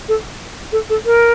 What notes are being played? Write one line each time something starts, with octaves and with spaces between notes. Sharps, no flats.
A4
A4
A4
A#4